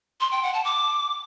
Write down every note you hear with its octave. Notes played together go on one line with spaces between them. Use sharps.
C6
G5
F#5
A5
D6